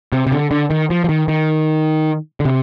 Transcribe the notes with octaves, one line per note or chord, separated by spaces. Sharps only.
C3
C3
D3
D3
D#3
F3
F3
D#3
D#3
D3
C3